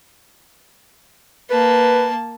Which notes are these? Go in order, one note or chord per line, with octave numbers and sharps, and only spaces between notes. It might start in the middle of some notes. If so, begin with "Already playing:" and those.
A#3 B4 A5